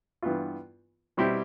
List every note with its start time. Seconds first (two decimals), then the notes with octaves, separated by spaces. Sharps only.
0.22 G2 E3 B3 F4
1.17 B2 G3 C4 E4 G4